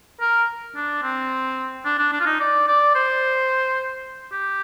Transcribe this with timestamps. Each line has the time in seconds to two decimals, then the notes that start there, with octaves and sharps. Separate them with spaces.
0.21 A#4
0.76 D4
1.03 C4
1.85 D4
1.98 D4
2.13 D4
2.20 F4
2.26 D#4
2.40 D5
2.68 D5
2.95 C5
4.32 G4